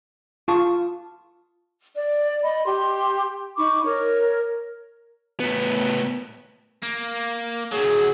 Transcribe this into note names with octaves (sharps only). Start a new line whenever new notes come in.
F4 A5 C#6 D#6
D5
D#5 B5
G4 C6
D#4 B5 C#6 D6
A#4 C#5
A2 B3
A#3
D2 F#3 G#4